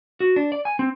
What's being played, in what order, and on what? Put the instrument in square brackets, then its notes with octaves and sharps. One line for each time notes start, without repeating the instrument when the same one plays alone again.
[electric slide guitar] F#4
D4
D5
G#5
C4